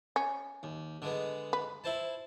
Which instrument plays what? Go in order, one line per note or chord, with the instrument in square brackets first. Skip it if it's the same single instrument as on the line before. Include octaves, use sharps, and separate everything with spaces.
[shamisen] C#4
[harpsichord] D#2
D3 G#3 B3
[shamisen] B4
[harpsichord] E4 C5 A5